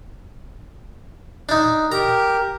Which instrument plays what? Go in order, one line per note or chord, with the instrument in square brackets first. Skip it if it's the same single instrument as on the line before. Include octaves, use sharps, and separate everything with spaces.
[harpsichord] D4 D#4
[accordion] G4 A#4 [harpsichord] A#5